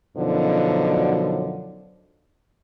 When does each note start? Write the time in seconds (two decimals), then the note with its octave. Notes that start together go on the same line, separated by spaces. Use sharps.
0.17 F#2 B2 D3 F3 F#3 D#4